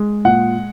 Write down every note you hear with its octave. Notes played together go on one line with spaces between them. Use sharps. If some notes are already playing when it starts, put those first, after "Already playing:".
Already playing: G#3
A#2 F#5